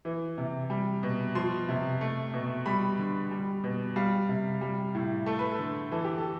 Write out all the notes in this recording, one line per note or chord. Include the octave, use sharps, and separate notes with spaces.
E3
C3
G3
B2
F3 C6
C3
A3
B2
G3 B5
D3
G3
B2
G3 F5
C3
G3
A2
A3 A4
B4
A4
D3
E3 A4
G4
A4